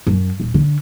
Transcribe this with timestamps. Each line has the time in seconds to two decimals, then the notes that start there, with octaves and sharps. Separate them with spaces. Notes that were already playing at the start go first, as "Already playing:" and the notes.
0.07 F#2
0.40 D#1
0.54 D3